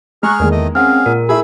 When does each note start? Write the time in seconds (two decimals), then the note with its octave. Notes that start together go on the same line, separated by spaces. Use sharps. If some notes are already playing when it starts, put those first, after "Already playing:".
0.23 G#3 G#4 A#5 C#6 F6 F#6
0.40 E2 D#3 G#3 A#3
0.51 A3 D#5
0.75 C4 C#4 G#4 F5 F#5 F6
1.06 A#2 A#4
1.29 A3 E4 G#4 B5 E6